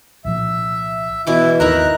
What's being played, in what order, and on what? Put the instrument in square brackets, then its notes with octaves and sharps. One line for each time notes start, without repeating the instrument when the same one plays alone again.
[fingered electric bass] C2 A#2 F3 [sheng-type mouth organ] E5
[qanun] B2 E3 D6 [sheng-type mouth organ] E4
[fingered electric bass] G#1 D#2 D#3 [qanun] D#4 A#4 E5 [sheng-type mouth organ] A#5 F#6